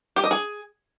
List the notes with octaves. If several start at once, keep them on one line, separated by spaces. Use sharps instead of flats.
G4
D#5
G#4